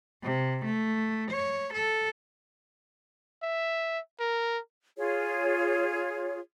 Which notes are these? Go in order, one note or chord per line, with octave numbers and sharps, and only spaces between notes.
C3
A3
C#5
A4
E5
A#4
F4 G#4 C#5